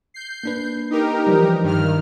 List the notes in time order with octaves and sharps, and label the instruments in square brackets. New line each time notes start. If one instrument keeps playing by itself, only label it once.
[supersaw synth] G6 C7
[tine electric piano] A#3 D4 B4
[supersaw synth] D#4 G4 A#4
[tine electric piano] E3 F3 G3
[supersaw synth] G2 D#3 F6